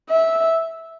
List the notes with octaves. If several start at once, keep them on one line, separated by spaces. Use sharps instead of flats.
E5